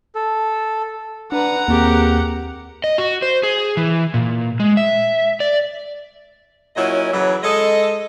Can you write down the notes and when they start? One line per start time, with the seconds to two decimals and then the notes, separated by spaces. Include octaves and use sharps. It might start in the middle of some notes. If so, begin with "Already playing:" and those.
0.15 A4
1.32 D4 B4 F#5 A#5
1.68 D#2 A#3 C4 G4 G#4 A#4
2.84 D#5
2.98 F#4
3.22 C5
3.43 G#4
3.77 E3
4.14 A#2
4.60 G#3
4.77 E5
5.40 D5
6.76 A#2 F#3 C#4 E4 D#5
7.13 C#3 E3 F#3
7.43 G#3 A4 D#5